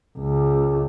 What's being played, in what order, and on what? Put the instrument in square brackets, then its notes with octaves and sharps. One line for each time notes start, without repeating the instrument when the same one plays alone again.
[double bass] C#2